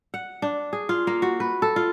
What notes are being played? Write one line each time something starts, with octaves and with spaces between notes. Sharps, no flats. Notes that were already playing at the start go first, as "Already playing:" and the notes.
F#5
D4
G#4
F4
A#3
F#4
B4
A4
F4